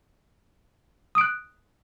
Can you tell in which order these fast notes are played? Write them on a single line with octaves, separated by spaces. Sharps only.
D#6 D7 F#6